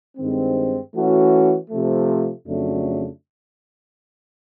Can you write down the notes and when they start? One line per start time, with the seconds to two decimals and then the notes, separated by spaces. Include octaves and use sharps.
0.18 G2 D#3 G#3 C4
0.95 E3 A3 C#4 F#4
1.70 C3 F3 A3
2.47 F2 C#3 F#3 A3 D4